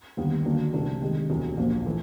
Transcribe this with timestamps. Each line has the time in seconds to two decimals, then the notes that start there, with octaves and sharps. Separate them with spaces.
0.17 D#2 D3 G3 B3
0.45 D#2 D3 F#3 A#3 D4
0.73 C2 C3 E3 A3 D4
1.01 C3 D#3 G#3
1.30 E1 D2 D3 F#3
1.57 A#1 A#2 F3 A#3
1.86 E3 A3